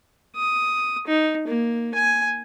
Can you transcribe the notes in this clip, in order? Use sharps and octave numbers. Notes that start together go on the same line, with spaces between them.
D#6
D#4
A#3
G#5